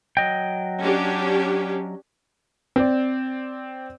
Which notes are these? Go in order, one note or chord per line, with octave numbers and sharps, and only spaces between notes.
F#3 D#5 G5
C#4 D4 G4
C4 D5